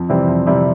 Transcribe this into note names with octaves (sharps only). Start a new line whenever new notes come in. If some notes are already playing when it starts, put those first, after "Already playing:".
Already playing: F2
C3 E3 G3 C4
F2
C3 E3 G3 C4